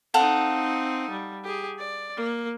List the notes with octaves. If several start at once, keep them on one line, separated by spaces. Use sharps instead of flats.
C4 D#4 A4 F5 F#5
G3
G4 G#4
D5
A#3